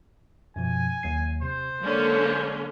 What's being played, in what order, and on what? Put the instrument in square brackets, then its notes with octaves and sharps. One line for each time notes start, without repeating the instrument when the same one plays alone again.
[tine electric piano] F#2 B2 F3 [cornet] G#5
[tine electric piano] D#2 F#3 C7
[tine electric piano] C3 [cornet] C5
[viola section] D3 A#3 C#4 [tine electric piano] F#3 G#3 D5